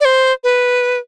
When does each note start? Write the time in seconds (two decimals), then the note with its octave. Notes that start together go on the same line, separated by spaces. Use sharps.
0.01 D5
0.05 C5
0.44 B4